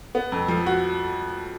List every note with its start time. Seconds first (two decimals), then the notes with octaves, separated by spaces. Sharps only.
0.15 B3
0.32 F2
0.48 F3
0.66 F#4